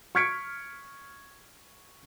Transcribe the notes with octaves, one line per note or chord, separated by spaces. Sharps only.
C#6 F6 G#6 B6 C#7 D7